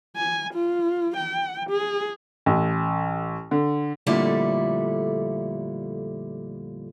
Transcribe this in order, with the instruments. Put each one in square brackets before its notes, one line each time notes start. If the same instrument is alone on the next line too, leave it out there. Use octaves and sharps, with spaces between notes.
[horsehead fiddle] G#5
F4
G5
G#4
[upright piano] A1
D3
[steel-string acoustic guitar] F2 A#2 D3 G3 A3 E4